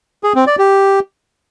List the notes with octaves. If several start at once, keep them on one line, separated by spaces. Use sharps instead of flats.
G#4
C4
D5
G4